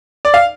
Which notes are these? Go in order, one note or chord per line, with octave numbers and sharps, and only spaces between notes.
D5
F5